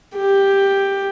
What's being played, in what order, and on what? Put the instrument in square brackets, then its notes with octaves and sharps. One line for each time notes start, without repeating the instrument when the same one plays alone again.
[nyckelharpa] G4